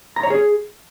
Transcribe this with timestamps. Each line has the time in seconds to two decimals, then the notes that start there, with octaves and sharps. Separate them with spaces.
0.16 A#5
0.23 C#5
0.30 G#4